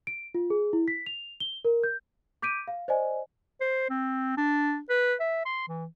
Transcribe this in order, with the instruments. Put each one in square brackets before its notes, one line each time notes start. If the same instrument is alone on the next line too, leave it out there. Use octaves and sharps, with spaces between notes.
[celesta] D7
F4
G#4
E4
B6
F7
G7
A#4
G6
D6 G6 B6 D7 D#7
F5
C5 D5 D#5 G#5
[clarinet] C5
C4
D4
B4
E5
C6
E3